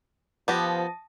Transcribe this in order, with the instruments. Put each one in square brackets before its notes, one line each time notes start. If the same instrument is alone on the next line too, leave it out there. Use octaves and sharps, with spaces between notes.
[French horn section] F3 [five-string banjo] B3 G4 [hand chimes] A5 D#6 A#6